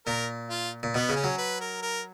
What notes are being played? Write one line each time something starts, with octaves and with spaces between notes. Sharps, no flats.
A#2 A#4
F4
A#2
B2 B3
C#3
C#4
F#3
B4
A#4
A#4